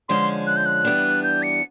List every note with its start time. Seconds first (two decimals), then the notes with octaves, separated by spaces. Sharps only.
0.09 D3 F3 G#3 C#4 C6
0.47 F#6
0.57 G6
0.66 F#6
0.85 E3 G3 B3 D4
1.23 G6
1.43 C#7